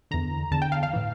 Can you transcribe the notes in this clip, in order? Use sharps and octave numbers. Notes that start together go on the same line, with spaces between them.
E2 D3 A#5
E2 D3 A5
G5
F5
F5
A2 E3